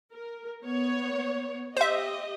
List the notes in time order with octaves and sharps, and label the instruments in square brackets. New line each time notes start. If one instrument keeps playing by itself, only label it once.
[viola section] A#4
B3 C#5
[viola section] G4 D#5 [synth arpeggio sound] C5 E5